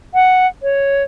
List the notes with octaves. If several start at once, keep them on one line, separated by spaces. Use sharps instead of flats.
F#5
C#5